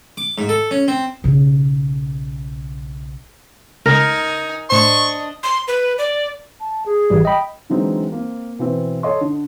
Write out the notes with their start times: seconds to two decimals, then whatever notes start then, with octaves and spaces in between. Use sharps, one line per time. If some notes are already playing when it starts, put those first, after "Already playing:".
0.17 D6
0.38 G#2
0.49 A4
0.71 C#4
0.88 C4
1.24 B1 C#3
3.86 C#2 D#4 A#4 G#5
4.70 A2 D4 C5 D#5 C#6
5.43 C6
5.68 B4
5.98 D5
6.60 A5
6.86 G#4
7.10 G#1 E3 G3
7.25 D#5 G5 B5
7.70 D3 E3 F#3 G#3 C4 D#4
8.12 A#3 C4
8.59 B2 E3 C4
9.03 A4 C#5 D#5 C6
9.21 D3